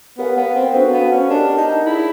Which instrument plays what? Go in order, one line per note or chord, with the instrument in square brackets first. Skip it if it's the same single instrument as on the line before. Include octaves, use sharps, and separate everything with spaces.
[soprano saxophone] B3 [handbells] G4 A#4 C#5 F5 G#5
[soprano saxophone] B3
C4
[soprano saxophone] B3 [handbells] D4 F#4 A4 C5 F5
[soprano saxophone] B3
C#4
[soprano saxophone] D4 [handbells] G4 A#4 D#5 F#5 A5
[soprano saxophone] D#4
[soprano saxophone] E4 [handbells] F4 G#4 C#5